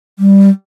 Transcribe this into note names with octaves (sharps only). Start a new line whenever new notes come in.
G3